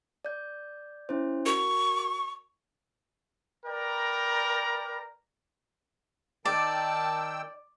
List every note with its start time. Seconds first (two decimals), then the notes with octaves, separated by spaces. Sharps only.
0.25 D5 G6
1.09 C#4 E4 C5
1.46 F#4 A#4 C#6
3.66 A#4 B4 D5 G5 A#5
6.45 D#3 D5 G5 A5 E6